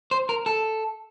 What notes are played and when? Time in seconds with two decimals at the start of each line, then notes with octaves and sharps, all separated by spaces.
0.11 C5
0.29 A#4
0.46 A4